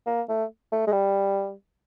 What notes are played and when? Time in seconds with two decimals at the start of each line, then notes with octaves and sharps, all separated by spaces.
0.07 A#3
0.29 A3
0.72 A3
0.87 G#3
0.93 G3